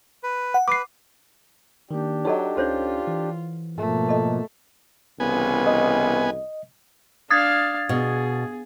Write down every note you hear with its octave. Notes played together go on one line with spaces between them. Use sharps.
B4
F#5
B4 D6 C7
D#3 A#3 D4 G4
F#3 D#4 A4 C#5 D#5
C#2 C#4 D#4 F4 A4 C5 C#5
E3
G#2 B2 F3 A3 A#3
A4 D#5
C2 C#3 E3 B3 G#5
D#5
D4 F5 D#6 G#6 A6
B2 G#4